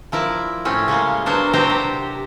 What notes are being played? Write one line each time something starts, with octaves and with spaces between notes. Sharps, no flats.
F3 E4 A#4 D5
A2 C4 C#4
C#3 G3 G#3 A#3
F#3 B3 D4 A#4 C5
C3 F#3 C4 G4 C5 A#5
G4